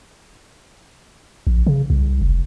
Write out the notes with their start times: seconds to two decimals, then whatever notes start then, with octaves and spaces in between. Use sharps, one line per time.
1.47 A#1
1.67 C#3
1.90 C2
2.21 F1